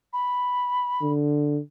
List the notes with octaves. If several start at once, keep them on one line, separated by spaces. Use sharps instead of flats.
B5
D3